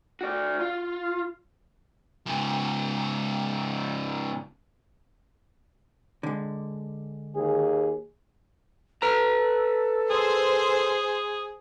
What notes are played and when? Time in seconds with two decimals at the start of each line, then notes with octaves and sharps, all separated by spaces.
0.21 F#4 D5
0.60 F4
2.27 G#2 C#3
6.23 D3 G#3
7.35 D#2 G#4
9.02 A4 B4 A#5
10.11 G#4 C5